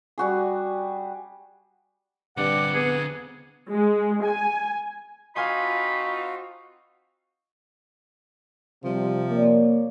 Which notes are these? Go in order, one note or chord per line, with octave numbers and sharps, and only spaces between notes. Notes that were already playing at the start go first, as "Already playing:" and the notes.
G3 F#4 G#4
G2 D3 C4 F#5 D6
B3 G#4
G#3
G#5
C4 D#4 F4 F#4 F5 G#5 B5 C6
C3 F3 G3 C6
A#3 C#5 D5